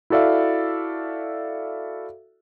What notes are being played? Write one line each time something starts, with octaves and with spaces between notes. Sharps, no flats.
E4 F#4 A4 D5 E5 F5